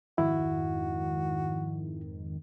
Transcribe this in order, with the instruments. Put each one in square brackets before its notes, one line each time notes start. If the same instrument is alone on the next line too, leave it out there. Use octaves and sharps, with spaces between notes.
[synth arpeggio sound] F2 G#2 D#3 [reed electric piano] E4 [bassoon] F#4